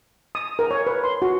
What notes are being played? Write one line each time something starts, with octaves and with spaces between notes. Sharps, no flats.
D#6
A#4
C#5
B4
C6
F#4